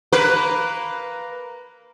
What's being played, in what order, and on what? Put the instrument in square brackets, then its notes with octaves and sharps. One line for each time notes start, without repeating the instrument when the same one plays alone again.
[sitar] A#3 A#4 B4